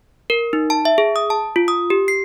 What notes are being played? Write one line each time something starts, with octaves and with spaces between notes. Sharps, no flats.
A#4
D#4
A5
E5
G#4
D#6
A5
F4
D#6
G4
C7